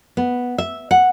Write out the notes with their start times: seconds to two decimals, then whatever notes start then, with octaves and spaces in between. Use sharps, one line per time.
0.17 B3
0.58 E5
0.91 F#5